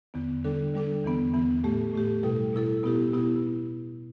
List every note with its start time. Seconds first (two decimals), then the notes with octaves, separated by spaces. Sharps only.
0.14 E2 D3 B3
0.44 D3 G3 D4 A4
0.74 D3 G3 D4 A4
1.04 E2 E3 B3
1.33 E2 E3 B3
1.64 A2 A3 G4
1.93 A2 A3 G4
2.23 B2 G3 E4 A4
2.53 B2 G3 E4 A4
2.83 B2 B3 E4 G4
3.12 B2 B3 E4 G4